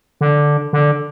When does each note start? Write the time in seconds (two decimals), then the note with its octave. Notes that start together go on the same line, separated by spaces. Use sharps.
0.21 D3
0.73 D3